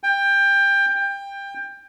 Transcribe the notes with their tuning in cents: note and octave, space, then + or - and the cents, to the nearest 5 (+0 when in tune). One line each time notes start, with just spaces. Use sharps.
G5 +20
G5 +20